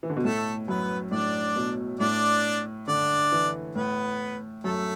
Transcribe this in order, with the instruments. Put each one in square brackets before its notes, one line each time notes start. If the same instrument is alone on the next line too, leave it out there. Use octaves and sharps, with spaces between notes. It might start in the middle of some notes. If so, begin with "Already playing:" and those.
[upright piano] E3
D3
B2
[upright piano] A2 [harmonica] A3 A4
[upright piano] F#2 [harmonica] B3 B4
[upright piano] A2 [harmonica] D4 D5
[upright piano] B2
[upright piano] A2 [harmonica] D4 D5
[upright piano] D3 [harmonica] D4 D5
[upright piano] E3
[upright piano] A2 [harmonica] B3 B4
[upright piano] F#2 [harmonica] A3 A4